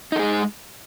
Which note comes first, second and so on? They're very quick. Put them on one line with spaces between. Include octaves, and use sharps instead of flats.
D#4 A4 G#4 G#3